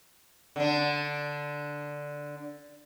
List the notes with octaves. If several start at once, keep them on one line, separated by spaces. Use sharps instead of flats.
D3 D4